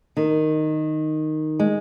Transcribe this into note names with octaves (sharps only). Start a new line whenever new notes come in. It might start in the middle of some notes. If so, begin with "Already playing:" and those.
D#3
G#3